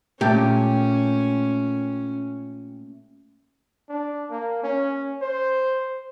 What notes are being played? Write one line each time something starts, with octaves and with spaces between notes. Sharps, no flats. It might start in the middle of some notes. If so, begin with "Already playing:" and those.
A#2 A3 C#4 G4 G5 A5
D4
A#3
C#4
C5